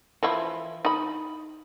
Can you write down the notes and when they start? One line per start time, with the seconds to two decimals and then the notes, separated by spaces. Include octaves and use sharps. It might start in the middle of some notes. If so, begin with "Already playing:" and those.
0.23 E3 F3 E4
0.85 D#4 B5